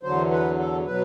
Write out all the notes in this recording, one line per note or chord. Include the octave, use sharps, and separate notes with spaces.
E2 D3 F#3 C5
B4
A4
B2 F#3 B4